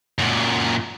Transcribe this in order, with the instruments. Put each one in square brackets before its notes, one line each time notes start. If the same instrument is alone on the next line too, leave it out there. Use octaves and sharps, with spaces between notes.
[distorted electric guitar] F#2 A#2